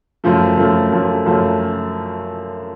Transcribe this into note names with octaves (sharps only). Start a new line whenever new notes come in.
F#2 F3 A3
F#2 F3 A3
F#2 F3 A3
F#2 F3 A3